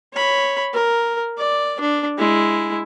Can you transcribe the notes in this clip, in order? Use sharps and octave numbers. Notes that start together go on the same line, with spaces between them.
C#5 B5
A#4
D5
D4
G#3 E4